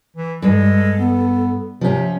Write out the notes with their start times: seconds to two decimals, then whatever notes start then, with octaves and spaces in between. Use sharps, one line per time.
0.16 E3
0.42 G2 G#3 A4
0.98 B3
1.81 C3 F3 C#4